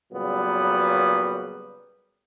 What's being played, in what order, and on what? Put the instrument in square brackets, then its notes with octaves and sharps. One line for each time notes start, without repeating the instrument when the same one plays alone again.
[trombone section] A#2 C#3 F#3 G3 B3